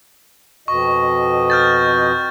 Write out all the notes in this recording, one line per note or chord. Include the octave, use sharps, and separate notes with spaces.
F2 B2 D#5 C#6
F6 G6 A6